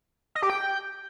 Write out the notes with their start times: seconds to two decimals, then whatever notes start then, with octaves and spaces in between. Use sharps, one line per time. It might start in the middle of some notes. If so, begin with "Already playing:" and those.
0.35 D#5
0.42 G4
0.50 G5